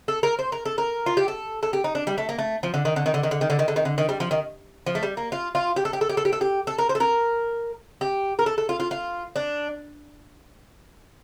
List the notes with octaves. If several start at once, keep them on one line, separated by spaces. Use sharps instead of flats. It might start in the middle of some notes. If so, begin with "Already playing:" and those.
A4
A#4
C5
A#4
A4
A#4
F4
G4
A4
A4
G4
D#4
D4
G3
A3
A#3
A3
F3
D3
D#3
D3
D#3
D3
D#3
D3
D#3
D3
D#3
D3
D#3
D3
D#3
G3
F3
D#3
F3
A3
G3
A#3
F4
F4
G4
A4
G4
A4
G4
A4
G4
A4
G4
A4
A#4
C5
A4
A#4
G4
A#4
A4
A4
F4
F4
F4
D4